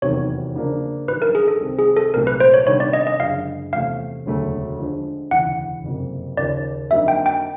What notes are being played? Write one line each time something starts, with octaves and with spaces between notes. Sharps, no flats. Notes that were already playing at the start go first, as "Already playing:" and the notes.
F1 E2 C3 D#3 F#3 C#5
C#3 F3 A#3 D4
A1 G2 D#3 F#3 B4
A#4
G#4
A4
C2 C3 D#3 G#3 C4
G#4
A4
C2 A#2 F#3 A3 A#4
B4
C5
C#5
C3 D#3 G3 B3 D4 C#5
D5
D#5
D#5
F#1 F#2 D3 F3 G#3 F5
E2 C3 F3 A3 C#4 F5
E1 D2 C#3 F#3 A3
D3 F3 G#3
E1 D2 C#3 E3 F#5
F#1 F2 C3 F3 A#3
D#2 C#3 F3 D5
F2 D3 F#3 A#3 D#4 E5
G5
G5